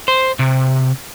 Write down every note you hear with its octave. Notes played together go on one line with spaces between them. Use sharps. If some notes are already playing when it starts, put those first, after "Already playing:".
C5
C3